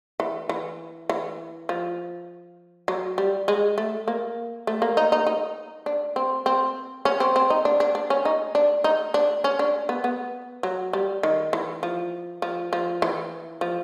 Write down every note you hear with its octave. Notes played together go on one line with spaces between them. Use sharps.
E3
E3
E3
F3
F#3
G3
G#3
A3
A#3
A3
A#3
D#4
D#4
D#4
D4
C4
C4
C#4
C4
C4
D#4
D4
D4
D4
C#4
D#4
D4
D#4
D4
C#4
D4
B3
B3
F#3
G3
D#3
E3
F3
F3
F3
E3
F3